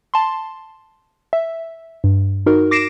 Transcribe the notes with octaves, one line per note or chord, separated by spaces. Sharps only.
A5 C6
E5
G2
D#4 F#4 A#4
D6 A#6 C7 D7 E7